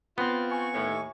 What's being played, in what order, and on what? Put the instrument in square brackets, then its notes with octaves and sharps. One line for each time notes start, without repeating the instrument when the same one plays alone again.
[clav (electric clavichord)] B3 [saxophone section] C4 F4
[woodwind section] G#5 C#6
[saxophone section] D#2 A2